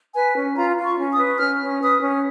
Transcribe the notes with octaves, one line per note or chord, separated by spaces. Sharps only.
B4 G#5
C#4
F4 A#5
F4
C#6
C#4
D#6
B4
C#4 F6
C#4
B4 D#6
C#4